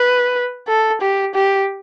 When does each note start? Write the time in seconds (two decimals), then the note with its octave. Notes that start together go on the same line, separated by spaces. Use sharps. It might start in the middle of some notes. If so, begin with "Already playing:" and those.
Already playing: B4
0.68 A4
1.01 G4
1.35 G4